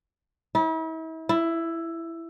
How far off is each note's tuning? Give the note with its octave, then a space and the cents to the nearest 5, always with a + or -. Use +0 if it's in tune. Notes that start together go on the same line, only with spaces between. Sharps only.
E4 -40
E4 +10